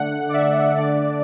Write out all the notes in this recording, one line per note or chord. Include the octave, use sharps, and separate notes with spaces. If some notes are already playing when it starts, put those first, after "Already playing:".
Already playing: D3 A3 D4 F#5
D5
E5
D3 A3 D4 D5